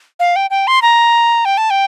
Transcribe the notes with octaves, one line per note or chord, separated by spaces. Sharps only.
F5
G5
G5
C6
A#5
G5
A5
G5